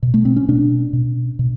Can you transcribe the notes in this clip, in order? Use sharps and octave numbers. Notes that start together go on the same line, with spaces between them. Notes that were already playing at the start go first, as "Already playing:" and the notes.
B2
A3
C4
C#4
B2 D4
B2
B2